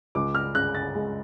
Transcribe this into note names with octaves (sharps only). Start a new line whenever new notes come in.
C#2 D6
F6
C#3 F#6
A6
G#3